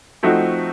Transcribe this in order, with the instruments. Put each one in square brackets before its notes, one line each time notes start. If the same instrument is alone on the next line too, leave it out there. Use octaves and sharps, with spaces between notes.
[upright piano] F3 A3 C4 D#4 F#4